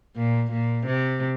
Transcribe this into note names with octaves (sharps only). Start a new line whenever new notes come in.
A#2
A#2
C3